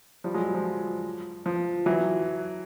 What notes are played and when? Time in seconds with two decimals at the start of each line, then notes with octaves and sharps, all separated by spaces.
0.24 F3 G3
0.34 F#3 G#3
0.54 F3
1.46 F3
1.86 E3 F#3